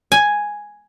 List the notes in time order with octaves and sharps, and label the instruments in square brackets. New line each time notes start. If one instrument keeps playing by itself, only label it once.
[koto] G#5